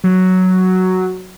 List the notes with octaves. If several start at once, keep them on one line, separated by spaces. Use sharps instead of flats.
F#3